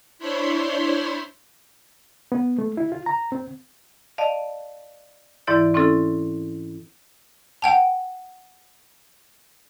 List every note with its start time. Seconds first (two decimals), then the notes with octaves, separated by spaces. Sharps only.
0.19 D4 E4 C5 C#5 B5 C6
2.32 B3
2.59 A3
2.77 E4
2.92 F4
3.06 A#5
3.32 C4
4.18 D5 D#5 F5 A5
5.47 G#2 E3 E4 D5 G6 A6
5.74 C4 C#4 E4 F4 A4
7.62 F#5 G5 A5